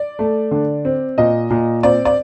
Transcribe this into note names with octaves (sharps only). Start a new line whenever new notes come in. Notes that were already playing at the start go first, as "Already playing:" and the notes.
Already playing: D5
A3
D3
C4
A#2 D#5
A#2
C4 D5
D5